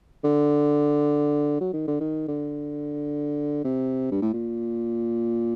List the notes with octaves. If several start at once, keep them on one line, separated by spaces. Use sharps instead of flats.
D3
F#3
D#3
D3
D#3
D3
C3
G2
A2
A#2